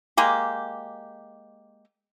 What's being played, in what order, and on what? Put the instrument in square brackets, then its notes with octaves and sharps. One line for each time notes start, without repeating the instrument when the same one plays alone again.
[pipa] G#3 A#3 G4